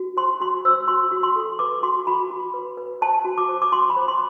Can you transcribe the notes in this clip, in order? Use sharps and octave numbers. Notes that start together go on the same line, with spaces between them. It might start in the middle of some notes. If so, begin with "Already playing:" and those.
Already playing: F#4
C5 C6
F#4 C6
C5 E6
F#4 C6
F#4
C6
A4
B4 D6
F#4 C6
F#4 B5
F#4
B4
B4
C5 A5
F#4
D6
C5
D6
F#4 C6
B5
C5
C6